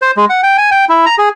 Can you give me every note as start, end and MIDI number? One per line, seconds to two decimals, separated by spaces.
0.02 0.11 72
0.17 0.25 56
0.29 0.41 78
0.43 0.57 79
0.58 0.70 80
0.71 0.85 79
0.89 1.05 64
1.06 1.15 82
1.18 1.29 68